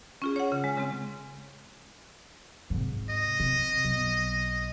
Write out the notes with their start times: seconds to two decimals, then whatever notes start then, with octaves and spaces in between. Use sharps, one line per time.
0.22 C#4 F4 G#4
0.36 C#5 F#5
0.52 C#3
0.64 G#3
0.77 C#3 G#3 C4
2.70 G#2 C3
3.10 D#5
3.40 C3
3.85 B1